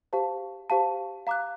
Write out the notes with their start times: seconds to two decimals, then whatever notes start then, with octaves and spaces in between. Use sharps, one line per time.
0.13 G4 C5 F5 A5
0.70 G4 C5 F5 A5
1.27 F5 A#5 D6 F#6